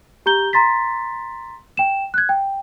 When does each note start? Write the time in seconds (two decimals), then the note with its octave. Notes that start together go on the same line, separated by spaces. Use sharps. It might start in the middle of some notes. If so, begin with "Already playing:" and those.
0.26 G4 A#5 G6 G7
0.53 A#5 C6 A6 B6
1.77 G5 E7
2.14 F#6 G#6
2.29 G5